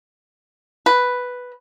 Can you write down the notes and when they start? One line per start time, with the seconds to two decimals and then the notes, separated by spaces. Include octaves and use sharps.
0.86 B4